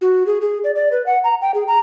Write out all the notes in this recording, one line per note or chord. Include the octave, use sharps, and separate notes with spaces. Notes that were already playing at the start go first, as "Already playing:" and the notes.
F#4
G#4
G#4
D5
D5
B4
F#5
A#5
G5
G#4
A#5